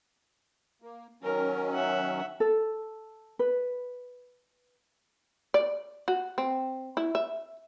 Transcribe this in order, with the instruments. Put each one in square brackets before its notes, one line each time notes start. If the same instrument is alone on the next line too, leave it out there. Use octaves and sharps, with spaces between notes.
[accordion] A#3
[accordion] D#3 F#3 C#4 [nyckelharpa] A#4
[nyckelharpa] E5 F#5
[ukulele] A4
B4
[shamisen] D5
F#4
C4
E4
E5